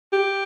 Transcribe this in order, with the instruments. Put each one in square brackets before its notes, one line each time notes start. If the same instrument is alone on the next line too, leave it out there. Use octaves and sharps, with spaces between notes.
[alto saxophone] G4